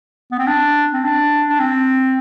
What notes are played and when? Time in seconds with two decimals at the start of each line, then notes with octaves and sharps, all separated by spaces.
0.31 B3
0.39 C4
0.46 D4
0.93 C4
1.04 D4
1.49 D4
1.59 C4